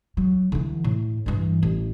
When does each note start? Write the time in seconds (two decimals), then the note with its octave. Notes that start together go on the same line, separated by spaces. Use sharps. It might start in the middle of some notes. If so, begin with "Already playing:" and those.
0.17 F#3
0.52 D3 E3
0.84 A2
1.26 G2 E3
1.63 A1